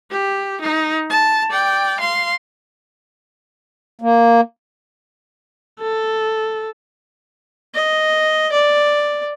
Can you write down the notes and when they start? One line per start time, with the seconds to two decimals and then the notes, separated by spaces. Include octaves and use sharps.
0.11 G4
0.61 D#4
1.09 A5
1.50 D5 G5
2.00 F5 C6
4.01 A#3
5.80 A4
7.74 D#5
8.52 D5